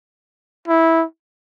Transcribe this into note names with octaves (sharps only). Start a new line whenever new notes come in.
E4